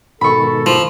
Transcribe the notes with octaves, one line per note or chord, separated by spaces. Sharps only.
G#2 B2 D#3 A4 B5 C#6
F3